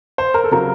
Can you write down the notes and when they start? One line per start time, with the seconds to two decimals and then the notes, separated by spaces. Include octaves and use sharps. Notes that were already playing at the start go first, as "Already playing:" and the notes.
0.18 C5
0.34 A#4
0.44 A4
0.51 C#3 F#3 A#4